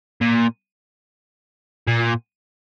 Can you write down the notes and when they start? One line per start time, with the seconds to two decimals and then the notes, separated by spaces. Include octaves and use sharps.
0.21 A#2
1.87 A#2